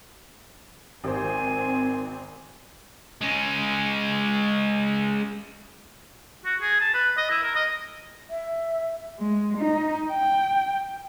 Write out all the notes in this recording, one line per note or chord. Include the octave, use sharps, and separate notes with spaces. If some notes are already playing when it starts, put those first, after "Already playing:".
G#1 C4 D#4 A#4 C5 G#5
G#3 C#4
F#4
G#4
A5
B4
D#5
E4
A#4
D#5
E5
G#3
D#4
G5